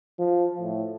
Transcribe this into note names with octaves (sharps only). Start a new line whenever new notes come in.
F3
A2